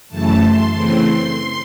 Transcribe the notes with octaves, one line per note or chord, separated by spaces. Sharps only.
F#2 C#3 E3 A3 A5
C6
C#3 E3 A3 C4 C6